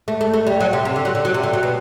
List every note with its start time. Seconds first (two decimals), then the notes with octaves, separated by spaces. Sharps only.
0.08 A3
0.21 A3
0.33 A3
0.47 G3
0.60 F#3
0.73 C3
0.85 C3
0.96 D3
1.05 F#3
1.15 D3
1.25 F#3
1.34 C3
1.43 D3
1.53 F#3
1.63 B2